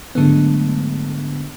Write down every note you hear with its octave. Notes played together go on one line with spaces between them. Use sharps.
G#2 D3 F#3 G#3 A3 B3